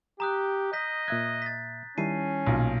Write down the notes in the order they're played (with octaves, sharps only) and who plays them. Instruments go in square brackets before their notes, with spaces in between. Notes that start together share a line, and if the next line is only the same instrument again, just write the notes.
[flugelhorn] G4 [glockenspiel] A#5 D#6 F#6
[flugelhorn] D#5 [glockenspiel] G6 B6
[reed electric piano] A#2 E5 G#6 [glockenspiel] F#6
[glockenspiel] A6 B6
[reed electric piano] D#3 G3 E4 [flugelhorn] C#4 [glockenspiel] A5 C7 D#7
[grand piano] B1 A#2